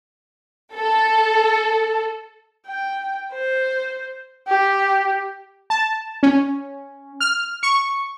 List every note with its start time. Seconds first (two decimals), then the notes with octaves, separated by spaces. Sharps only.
0.77 A4
2.67 G5
3.32 C5
4.48 G4
5.70 A5
6.23 C#4
7.20 F6
7.63 C#6